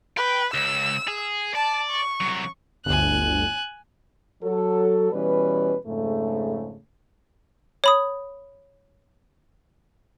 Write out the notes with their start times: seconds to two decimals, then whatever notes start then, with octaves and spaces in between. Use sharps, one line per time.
0.17 B4 G5
0.54 C#2 E6
1.08 G#4
1.55 D5 A5
1.91 C#6
2.20 C2 F#3
2.85 G1 D2 G#5 F#6
4.43 F#3 A4
5.12 B2 E3 G3 C#4 B4
5.86 F2 G#2 C#3 A3
7.84 C#5 B5 D#6